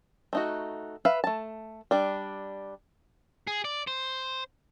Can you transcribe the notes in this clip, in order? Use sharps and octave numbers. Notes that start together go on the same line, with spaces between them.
A3 D#4 F#4
B4 E5 F5
A3 A5
G3 D4
G#4
D5
C5